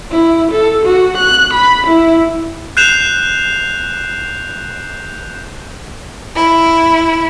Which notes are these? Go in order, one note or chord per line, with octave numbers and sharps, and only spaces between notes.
E4
A4
F#4
F#6
B5
E4
F#6 G6 C7 E7 F7
E4